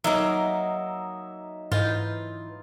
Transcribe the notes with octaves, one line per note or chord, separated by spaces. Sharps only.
F#3 A#3 D#4 E5 E6
G#2 E3 F4 B4 D#5 G6